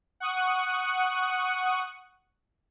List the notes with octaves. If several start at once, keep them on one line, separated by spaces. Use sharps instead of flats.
F#5 C#6 D#6 F#6